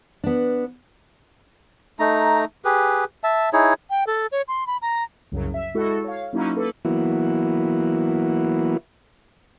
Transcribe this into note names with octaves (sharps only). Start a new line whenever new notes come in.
B3 D4
A3 D#4 A#5
G4 G#4 B4
E5 A5
D#4 E4 G#4 C#5
G5
A4
C#5
C6
B5
A#5
C2 F#2 C#3 F#3
E5
G#3 E4 F#4 A4
C#5 F5
F#3 A#3 C#4 D#4 E4 F#4
A#3 A4 B4
E3 F#3 A#3 B3 E4 F#4